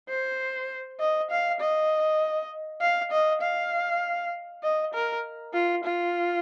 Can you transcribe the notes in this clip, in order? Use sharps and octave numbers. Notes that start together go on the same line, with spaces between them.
C5
D#5
F5
D#5
F5
D#5
F5
D#5
A#4
F4
F4